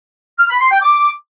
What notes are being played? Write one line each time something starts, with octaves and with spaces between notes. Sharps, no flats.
F6
B5
C6
G5
D6